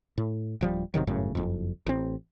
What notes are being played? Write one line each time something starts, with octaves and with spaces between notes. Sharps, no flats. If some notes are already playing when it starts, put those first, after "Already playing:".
A2
D1 F3 G3
G1 C3 D#3 F#3
G1 F#2 A2 C#3
F#1 F2
A1 C4